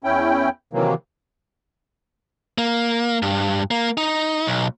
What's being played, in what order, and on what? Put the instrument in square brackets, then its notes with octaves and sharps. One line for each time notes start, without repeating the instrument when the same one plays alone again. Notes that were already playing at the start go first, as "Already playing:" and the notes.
[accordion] E2 C#4 E4 G5
C3 D#3 E3 F#3 A#3
[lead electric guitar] A#3
G2
A#3
D#4
B1